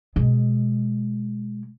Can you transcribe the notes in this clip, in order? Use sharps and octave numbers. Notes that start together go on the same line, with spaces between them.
B2 G#3